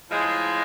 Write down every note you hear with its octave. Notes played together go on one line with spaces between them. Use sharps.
A2 F3 G#3